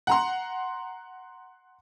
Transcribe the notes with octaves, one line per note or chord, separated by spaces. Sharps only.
F#5 A#5 C6